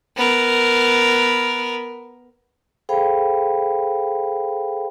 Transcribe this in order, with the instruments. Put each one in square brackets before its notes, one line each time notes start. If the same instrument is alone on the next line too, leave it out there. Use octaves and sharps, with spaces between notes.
[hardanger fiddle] B3 A#4
[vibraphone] G#4 A4 C5 F5 G5 B5